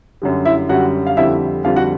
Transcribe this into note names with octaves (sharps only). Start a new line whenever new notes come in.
F#2 D3 G3
E4 E5
F#2 D3 G3 F#4 F#5
F5
F2 D3 G3 E4 E5
F2 D3 G3 F4 F5
F#4 F#5